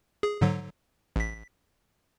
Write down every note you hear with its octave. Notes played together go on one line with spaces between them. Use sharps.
G#4
G#2 D3 F#3
A1 B6